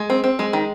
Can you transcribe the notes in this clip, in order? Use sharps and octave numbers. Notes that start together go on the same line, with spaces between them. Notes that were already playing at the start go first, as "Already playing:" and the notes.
Already playing: G#3
C4
C4
G#3
D#3